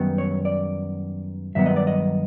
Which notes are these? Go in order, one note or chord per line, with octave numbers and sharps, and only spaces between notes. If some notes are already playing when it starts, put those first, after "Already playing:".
Already playing: F#2 D#3 G3 B3
C#5
D5
G2 D#3 F#3 B3 E5
D#5
D5
D#5